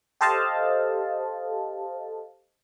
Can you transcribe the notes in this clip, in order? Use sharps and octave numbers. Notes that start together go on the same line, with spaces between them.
G4 A4 C5 D#5 F5 A5